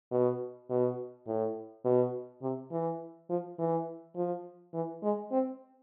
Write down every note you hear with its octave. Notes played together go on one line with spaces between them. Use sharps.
B2
B2
A2
B2
C3
E3
F3
E3
F3
E3
G#3
C4